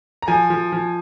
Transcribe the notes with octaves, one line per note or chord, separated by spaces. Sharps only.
A#5
F3 G#5
F3
F3